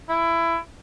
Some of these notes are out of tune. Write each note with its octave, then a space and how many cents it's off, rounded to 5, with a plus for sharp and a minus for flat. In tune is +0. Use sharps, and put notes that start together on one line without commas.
E4 +20